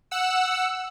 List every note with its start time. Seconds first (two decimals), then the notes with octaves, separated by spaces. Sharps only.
0.11 F#5 E6